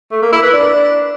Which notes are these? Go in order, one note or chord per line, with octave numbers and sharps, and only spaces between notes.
A3
A#3
E4
B4
D4